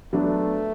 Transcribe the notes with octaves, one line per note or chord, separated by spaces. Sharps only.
F#3 A3 B3 D4